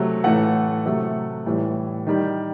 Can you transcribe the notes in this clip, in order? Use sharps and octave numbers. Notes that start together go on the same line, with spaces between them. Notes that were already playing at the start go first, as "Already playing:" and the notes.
Already playing: C3 F#3 A3
A2 E3 A3 F#5
C3 F#3 A3
A2 E3 G3
D#3 G3